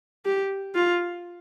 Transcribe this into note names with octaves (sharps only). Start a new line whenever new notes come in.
G4
F4